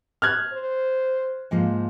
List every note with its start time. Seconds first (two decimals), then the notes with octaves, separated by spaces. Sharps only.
0.22 F6 F#6 G#6
0.53 C5
1.51 G#2 F3 A#3